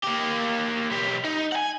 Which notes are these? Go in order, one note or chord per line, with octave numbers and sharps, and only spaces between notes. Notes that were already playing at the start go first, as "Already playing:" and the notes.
A#3 G4
B1 G4
D#4
F#5 G#5